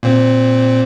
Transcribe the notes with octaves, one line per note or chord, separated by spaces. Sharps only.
A#2 C4